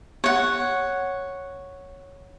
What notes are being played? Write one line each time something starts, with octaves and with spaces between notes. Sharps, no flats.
C#5 F#5